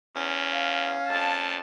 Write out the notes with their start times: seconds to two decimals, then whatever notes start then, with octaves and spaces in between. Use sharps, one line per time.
0.16 E2 C#4
0.53 F5
1.10 F2 A5